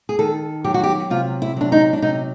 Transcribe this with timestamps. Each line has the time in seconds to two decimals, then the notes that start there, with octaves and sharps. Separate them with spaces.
0.09 G#4
0.19 D#3 A4
0.64 F#3 G4
0.74 F#4
0.83 G4
1.10 C3 F4
1.42 E4
1.57 F#3 D4
1.72 D#4
1.93 D4
2.02 C3 D#4